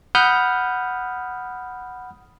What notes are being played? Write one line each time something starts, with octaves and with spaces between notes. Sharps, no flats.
F#5 B5 D#6 F6 G6